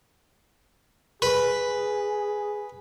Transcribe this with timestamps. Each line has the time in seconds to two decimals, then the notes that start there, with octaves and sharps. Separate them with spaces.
1.22 G#4 B4